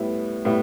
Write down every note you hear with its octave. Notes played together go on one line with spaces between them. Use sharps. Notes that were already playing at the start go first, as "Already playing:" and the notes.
Already playing: A2 G3 B3 E4
A2 G3 B3 E4